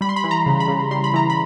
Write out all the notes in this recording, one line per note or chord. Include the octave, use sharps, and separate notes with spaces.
G3 B5
C6
B5
E3
A#5
C#3
B5
C#3
G3 C6
B5
E3 A#5
B5